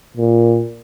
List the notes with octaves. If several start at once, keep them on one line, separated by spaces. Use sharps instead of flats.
A#2